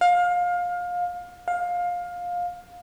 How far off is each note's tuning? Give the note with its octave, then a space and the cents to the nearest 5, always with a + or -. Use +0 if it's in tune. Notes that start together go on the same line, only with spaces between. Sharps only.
F5 +25
F5 +20